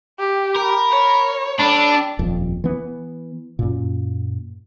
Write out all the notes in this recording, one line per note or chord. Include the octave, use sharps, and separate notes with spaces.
G4
A#4 B5
C#5
D4 A4 G5 B5
D#1 F2
E3 B3
F#2 A#2